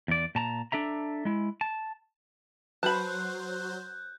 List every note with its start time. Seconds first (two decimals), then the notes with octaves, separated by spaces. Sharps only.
0.08 E2 D5
0.35 A#2 A5 A#5
0.72 D4 A4 E5 A#5
1.25 G#3 E4
1.61 A5
2.83 F#3 F#4 B4 C5 A5 B5 F#6 G6